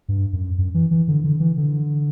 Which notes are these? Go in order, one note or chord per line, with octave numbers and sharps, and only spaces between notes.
G2
F#2
F#2
E3
E3
D3
D3
E3
D3